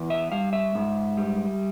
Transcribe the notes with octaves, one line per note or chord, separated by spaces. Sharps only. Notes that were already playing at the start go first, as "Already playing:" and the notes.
Already playing: E2
E5
G3 F5
E5
G#2
G3